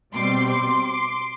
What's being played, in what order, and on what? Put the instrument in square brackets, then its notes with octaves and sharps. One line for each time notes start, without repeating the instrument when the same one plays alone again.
[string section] B2 G3 C4 C6 D6
C6 D6
C6 D6